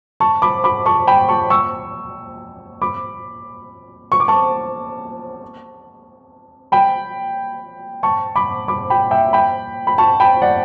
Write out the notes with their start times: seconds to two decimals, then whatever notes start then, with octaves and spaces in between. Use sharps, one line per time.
0.20 A5 C#6
0.42 B5 D6
0.64 B5 D6
0.86 A5 C#6
1.07 G5 B5
1.29 A5 C#6
1.50 C#6 E6
2.82 B5 D6
4.12 C#6
4.20 D6
4.28 A5 C#6
6.72 G5 B5
8.03 A5 C#6
8.36 B5 D6
8.68 B5 D6
8.90 G5 B5
9.11 E5 G5
9.33 G5 B5
9.87 B5
9.98 A5 C#6
10.20 G5 B5
10.42 D5 F#5